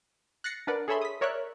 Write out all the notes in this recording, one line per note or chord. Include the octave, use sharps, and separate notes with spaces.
F#6 A6 A#6 C7 C#7
D4 A#4 B4 D5 F#5
G#4 A4 C#5 E5 B5 C6
D#6 B6
A#4 C#5 D5 E5 F#6